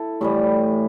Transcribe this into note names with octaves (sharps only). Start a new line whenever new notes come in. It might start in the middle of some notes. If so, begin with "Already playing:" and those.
Already playing: E4 A4
A2 E3 G3 G4 B4